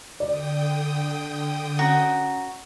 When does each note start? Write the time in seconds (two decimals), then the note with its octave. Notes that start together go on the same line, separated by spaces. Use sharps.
0.20 D3 D5 G5 D#6
1.79 C#4 F#4 F#5 A#5